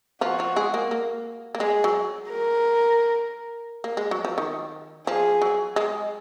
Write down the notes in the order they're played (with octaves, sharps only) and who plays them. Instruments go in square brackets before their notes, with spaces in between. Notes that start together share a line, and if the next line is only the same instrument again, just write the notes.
[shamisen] F3 F4 [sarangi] F#4
[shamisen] F3 F4
G#3 G#4
A#3
A#3
A#3
[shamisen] G#3 [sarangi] G#4
[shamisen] F#3
[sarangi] A#4
[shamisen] A#3
G#3
F#3
F3
D#3
[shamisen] F3 [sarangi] G#4
[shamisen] F#3
G#3